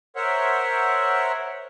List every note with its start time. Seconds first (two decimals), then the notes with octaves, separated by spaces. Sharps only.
0.16 A#4 C5 C#5 E5 F#5